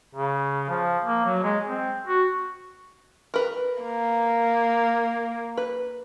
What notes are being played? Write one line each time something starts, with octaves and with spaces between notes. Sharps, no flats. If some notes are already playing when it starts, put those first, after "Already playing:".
C#3
F3
A#3
F#3
G#3
C4
F#4
A#4 B4
A#3
B4